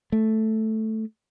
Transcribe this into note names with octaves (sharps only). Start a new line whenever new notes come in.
A3